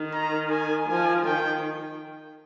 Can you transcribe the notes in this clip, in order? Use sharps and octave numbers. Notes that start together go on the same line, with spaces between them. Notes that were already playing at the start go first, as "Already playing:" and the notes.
Already playing: D#3
A#5
G#5
F3 G#5
D#3 G5